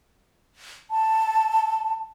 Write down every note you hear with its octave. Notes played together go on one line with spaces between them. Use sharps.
A5